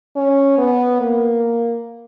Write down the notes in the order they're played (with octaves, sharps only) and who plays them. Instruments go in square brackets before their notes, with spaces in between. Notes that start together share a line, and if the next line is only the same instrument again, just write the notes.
[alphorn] C#4
B3
A#3